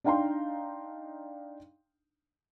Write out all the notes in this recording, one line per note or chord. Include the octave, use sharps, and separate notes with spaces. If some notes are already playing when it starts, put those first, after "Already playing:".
D4 D#4 F5 G5 A#5 C6